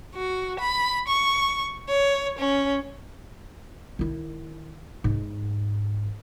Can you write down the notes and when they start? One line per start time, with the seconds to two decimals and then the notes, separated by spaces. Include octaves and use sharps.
0.15 F#4
0.60 B5
1.08 C#6
1.89 C#5
2.39 C#4
3.99 D#3 E4
5.04 G#2